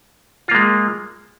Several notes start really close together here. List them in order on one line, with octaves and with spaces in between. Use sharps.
F4 A#3 G#3